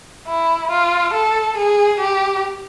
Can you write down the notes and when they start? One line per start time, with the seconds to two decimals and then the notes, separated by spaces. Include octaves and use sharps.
0.27 E4
0.71 F4
1.14 A4
1.58 G#4
2.00 G4